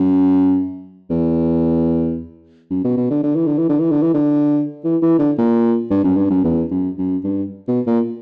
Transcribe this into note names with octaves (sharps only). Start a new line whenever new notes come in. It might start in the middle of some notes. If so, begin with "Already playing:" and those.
Already playing: F#2
E2
F#2
B2
B2
D3
D3
E3
D3
E3
D3
E3
D3
E3
D3
E3
E3
D3
A#2
G2
F#2
G2
F#2
E2
F#2
F#2
G2
B2
A#2